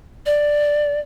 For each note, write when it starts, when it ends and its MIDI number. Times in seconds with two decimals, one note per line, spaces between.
0.26 1.00 74